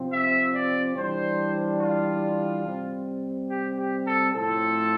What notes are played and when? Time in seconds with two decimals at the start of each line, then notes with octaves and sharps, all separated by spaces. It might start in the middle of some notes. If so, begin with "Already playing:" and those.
Already playing: C3 F3 C4
0.13 E5
0.55 D5
0.96 E3 G3 D4 C5
1.81 F4
2.65 C3 G3 C4
3.49 G4
3.78 G4
4.07 A4
4.34 A2 F3 A3 C4 A4